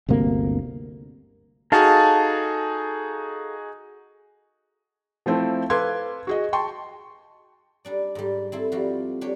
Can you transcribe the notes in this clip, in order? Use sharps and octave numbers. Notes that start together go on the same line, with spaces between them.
G1 D2 C3 A#3
D#4 F#4 G#4 A4 F5 A5
F3 A3 C4 E4
A4 B4 F5 C6 D6 G#6
F#4 G#4 D#5
G5 A5 C6 C#6
G3 D4 D5
G#2 G3
C4 E4 A4
F3 G3 F#4 G4
D4 G4 C#5